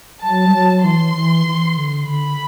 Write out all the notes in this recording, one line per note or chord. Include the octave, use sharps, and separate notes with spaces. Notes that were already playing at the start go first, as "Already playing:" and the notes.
F#3 A5
G3
F#3
E3 C6
E3
E3
D3
D3 B5